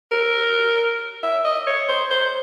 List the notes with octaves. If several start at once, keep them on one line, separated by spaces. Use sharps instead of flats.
A#4
E5
D#5
C#5
C5
C5